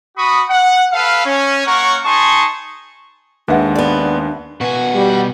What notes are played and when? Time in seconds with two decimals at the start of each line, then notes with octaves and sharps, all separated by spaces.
0.17 F#4 B5 C#6 D#6
0.49 F#5
0.92 A4 B4 F5
1.26 C#4
1.66 A#3 A#4 C#5 F#5 C#6
2.05 D#4 G#4 A5 C6 C#6
3.48 D#2 G#3 D4 B4 E5 F#5
3.75 B3 D5
4.61 B2 F#4 B4 G#5
4.94 G3